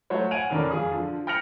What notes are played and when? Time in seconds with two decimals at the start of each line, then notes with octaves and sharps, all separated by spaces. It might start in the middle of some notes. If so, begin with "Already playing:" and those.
0.10 F#3 A3 F#4 C5 C#5
0.31 F#5 G#5 G#6 D7 D#7 F7
0.49 F1 D#2 D3 C#4 D4 A#4
0.71 F2 F4 G#4 D#6
0.91 D3 F3
1.27 G5 F6 A#6 C#7 F7